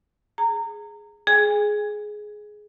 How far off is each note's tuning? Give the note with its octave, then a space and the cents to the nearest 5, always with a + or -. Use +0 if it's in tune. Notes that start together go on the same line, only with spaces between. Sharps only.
G#4 +0 A#5 -25
G#4 +15 G#5 -35